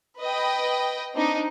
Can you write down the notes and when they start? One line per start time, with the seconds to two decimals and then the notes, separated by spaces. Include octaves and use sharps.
0.20 B4 D#5 G5
1.13 C4 D4 D#4